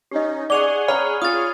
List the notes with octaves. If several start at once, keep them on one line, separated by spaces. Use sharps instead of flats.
C#4 D#4 G4 D#5
G#4 D5 F#5 G#5 C#6 D6 F7 G7
C#5 A#5 B5 C#6 F6
F4 G#4 C#5 D#6 F6 A6